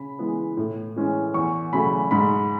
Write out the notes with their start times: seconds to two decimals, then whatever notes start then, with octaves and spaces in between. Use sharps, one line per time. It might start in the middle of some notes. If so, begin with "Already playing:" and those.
Already playing: C#3 B5
0.19 E3 G#3 B3
0.57 A2
0.96 E3 G#3 C#4
1.34 E2 C#6
1.73 C#3 F#3 A3 B5
2.11 G#2 B5